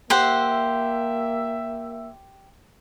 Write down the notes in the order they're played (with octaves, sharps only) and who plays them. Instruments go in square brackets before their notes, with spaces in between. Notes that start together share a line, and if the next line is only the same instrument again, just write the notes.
[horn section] A#3 E5 [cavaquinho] G4 C5 F#5